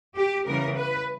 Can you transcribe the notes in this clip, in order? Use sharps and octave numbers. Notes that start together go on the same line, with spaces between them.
G4
C#3 E3 G3 B3 A#4
B4